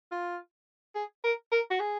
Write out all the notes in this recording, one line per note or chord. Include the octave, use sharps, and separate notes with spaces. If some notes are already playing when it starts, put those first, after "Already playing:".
F4
G#4
A#4
A#4
F#4
G#4